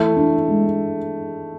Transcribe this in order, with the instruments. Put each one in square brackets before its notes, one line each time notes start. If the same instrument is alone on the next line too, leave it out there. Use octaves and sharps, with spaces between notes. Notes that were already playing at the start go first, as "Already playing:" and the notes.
Already playing: [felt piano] E3 [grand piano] A3
[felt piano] D4
G#3